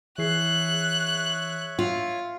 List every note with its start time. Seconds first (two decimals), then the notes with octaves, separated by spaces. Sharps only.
0.18 E3 G#4 C#5 E5 C#6 F#6 C7
1.79 F4